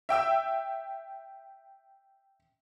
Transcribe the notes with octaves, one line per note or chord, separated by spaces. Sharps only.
E5 G5 E6